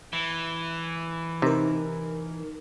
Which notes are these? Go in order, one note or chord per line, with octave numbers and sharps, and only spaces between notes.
E3
C3 D#4 A#4